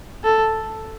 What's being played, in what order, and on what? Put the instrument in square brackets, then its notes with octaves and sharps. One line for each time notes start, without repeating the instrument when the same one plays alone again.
[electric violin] A4